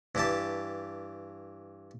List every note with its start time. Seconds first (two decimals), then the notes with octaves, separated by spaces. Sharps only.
0.15 G2 E3 G4 A5